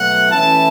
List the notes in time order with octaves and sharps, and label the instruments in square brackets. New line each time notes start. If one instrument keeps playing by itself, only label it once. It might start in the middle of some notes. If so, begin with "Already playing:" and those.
Already playing: [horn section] B2 F#3 A3 F#5
E3 A3 C#4 E4 A5